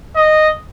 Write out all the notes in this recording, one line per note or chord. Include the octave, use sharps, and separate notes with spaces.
D#5